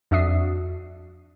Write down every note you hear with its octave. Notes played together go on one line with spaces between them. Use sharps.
F2 D4 F#4 E5 D#6 C7